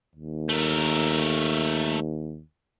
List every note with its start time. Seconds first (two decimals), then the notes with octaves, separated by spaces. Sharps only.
0.16 D#2
0.49 A3 A#4